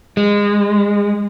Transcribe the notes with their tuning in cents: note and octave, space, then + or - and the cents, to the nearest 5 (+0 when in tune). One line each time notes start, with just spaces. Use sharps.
G#3 -25